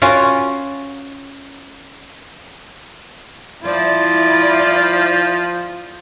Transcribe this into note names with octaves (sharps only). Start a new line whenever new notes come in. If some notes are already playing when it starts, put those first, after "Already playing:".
C#4 F4 F#4 A#4
F3 E4 F4 D5